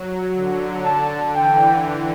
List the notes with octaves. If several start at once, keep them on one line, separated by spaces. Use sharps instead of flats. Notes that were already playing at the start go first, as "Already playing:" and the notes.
Already playing: F#3
D3
A5
E3 G5